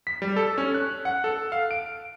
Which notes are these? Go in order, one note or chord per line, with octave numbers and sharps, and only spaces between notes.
B6
G3
A4
C#4
F#6
F#5
A4
F5
D7